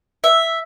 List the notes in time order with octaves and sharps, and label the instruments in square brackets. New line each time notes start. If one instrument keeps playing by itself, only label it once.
[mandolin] E5